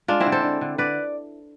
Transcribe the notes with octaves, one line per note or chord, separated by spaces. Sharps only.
G#3 D4 F4
C4 E4
D3
A4 C5
D3
D3
D3 B4 D5